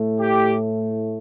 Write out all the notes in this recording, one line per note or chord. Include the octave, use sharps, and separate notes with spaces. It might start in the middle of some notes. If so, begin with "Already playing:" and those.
Already playing: A2 A3
G4